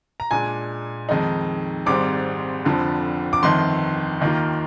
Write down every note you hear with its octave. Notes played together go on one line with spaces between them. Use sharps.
A#5
A#2 G#3 D4 G#5
F2 D#3 G#3 D#4
G#1 G#2 G3 C4 D6
F1 F2 D3 F3
D6
G1 F2 D#3 C6
D#2 D#3 A#3 F4